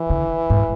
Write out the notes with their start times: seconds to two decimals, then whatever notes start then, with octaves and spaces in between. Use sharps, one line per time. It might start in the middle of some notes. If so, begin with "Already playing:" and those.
Already playing: E3
0.10 D3
0.50 G#2